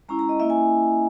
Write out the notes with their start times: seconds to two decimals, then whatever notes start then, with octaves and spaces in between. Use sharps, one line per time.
0.09 G#3 C#4 E4 A#5
0.19 A#5
0.29 D#5
0.40 A#3 C#4 E4 E5
0.50 G#5